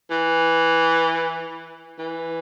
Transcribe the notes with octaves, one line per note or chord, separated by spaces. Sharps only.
E3
E3